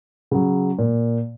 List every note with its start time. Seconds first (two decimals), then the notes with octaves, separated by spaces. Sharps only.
0.31 C#3 F#3
0.79 A#2